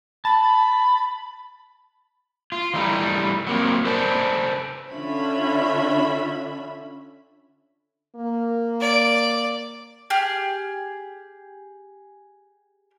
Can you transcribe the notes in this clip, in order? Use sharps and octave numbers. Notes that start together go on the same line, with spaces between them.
A5 B5
F4
E3 G3 A3 D#4
F#3 A#3 C4
A4 B4 C5 D5 G#5 A5
D3 C#4 D4 F4 E5 B5
A#3
D5
G4 G#4 F6